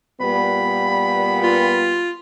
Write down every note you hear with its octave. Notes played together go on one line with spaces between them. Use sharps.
A#2 G3 B3 B5
F4